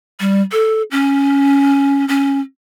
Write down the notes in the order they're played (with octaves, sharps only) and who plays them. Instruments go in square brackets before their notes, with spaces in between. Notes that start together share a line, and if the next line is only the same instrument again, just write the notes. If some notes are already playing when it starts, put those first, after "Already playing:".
[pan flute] G3
A4
C#4
C#4